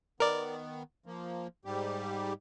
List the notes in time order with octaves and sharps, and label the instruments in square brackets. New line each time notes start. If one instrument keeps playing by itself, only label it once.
[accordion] D#3 B3 [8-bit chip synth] A#4 D5
[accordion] F3 A#3
G#2 G3 G4